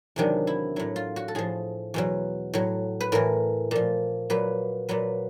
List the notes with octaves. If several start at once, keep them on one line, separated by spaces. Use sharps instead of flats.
E2 C3 D#3 F#3 D4
E4
A2 F#3 E4
F4
F#4
A4
A2 F3 G#4
E2 B2 F#3
A2 F#3
B4
A2 E3 A#4
A#2 F3
A#2 F#3 B4
A#2 F#3 B4